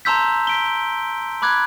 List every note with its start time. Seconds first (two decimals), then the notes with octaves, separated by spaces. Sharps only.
0.05 A5 A#5 C6 E6 G6 B6
0.47 B6 D7 G7
1.42 B5 D6 F#6 G#6